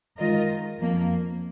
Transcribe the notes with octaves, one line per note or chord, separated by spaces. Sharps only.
D#3 G#3 F4 A#4 D#5
F2 F3 A#3